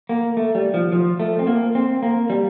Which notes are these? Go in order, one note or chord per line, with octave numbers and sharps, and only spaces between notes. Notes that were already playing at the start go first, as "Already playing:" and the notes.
A#3
A3
G3
F3
F3
A3
C4
A#3
C4
A#3
G3